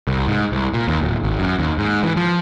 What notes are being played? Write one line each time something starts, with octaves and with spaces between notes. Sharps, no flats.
C2
G#2
C2
A#2
D#2
D1
G#1
F#2
D#2
G#2
E3
F3